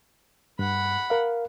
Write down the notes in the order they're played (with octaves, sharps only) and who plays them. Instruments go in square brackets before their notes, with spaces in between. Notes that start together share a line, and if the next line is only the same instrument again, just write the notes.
[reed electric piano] G2 [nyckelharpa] F#5 B5
[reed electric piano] A#4 F5